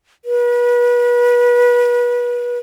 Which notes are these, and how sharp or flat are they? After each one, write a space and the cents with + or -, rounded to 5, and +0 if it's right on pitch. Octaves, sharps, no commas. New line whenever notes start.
B4 -30